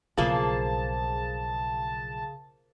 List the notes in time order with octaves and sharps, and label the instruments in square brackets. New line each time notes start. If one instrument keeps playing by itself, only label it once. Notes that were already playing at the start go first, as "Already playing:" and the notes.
[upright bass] B1 [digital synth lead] C#3 [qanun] F3 A#3 G#4 [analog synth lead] A5